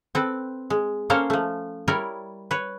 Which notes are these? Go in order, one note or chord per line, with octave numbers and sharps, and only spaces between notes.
C4 A4 B4
G#3
A#3 C#4 A4 C5 C#5 F5
F3 A3
G3 E4 A#4 C#5 D5
B4 C#5